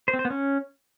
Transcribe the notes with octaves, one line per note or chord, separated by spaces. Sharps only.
C5
C4
C5
B3
C#4